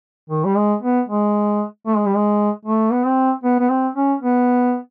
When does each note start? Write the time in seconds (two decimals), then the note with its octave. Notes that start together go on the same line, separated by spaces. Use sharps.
0.30 D#3
0.45 G3
0.57 G#3
0.83 B3
1.09 G#3
1.87 A3
1.97 G#3
2.07 G3
2.16 G#3
2.66 A3
2.92 B3
3.04 C4
3.44 B3
3.60 B3
3.70 C4
3.96 C#4
4.22 B3